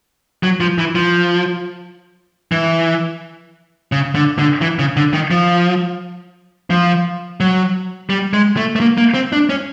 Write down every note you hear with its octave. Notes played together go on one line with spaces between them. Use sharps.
F#3
F3
E3
F3
E3
C#3
D3
D3
E3
C#3
D3
D#3
F3
F3
F#3
G3
G#3
A3
A3
A#3
A#3
C4
D4
C#4